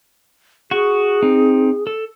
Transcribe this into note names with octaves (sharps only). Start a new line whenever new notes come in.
F#4 G#4 C#6
C4 D#4
A4